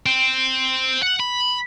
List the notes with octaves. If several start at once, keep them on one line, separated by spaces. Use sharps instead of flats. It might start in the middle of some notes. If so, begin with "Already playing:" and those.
C4
F#5
B5